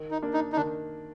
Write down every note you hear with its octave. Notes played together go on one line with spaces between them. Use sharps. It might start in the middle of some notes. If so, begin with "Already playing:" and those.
Already playing: D#3
D#4
A#3 D4
D#4
D#4
D#3 D4